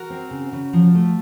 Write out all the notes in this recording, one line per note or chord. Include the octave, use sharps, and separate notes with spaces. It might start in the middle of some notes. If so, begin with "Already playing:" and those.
Already playing: F#4 A#4
C4
C#3
C#3
F3
A3